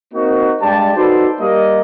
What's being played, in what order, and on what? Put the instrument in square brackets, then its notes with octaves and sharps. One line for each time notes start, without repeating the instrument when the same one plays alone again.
[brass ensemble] A#3 C4 D#4 F#4
G2 G#3 G4 D5 A5
D#4 F#4 A4 B4 C5 D5
G3 A#3 D#5